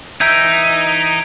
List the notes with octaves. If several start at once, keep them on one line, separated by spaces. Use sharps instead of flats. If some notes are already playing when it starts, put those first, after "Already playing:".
E3 D#4 E5 G#5 G6 G#6 B6 D7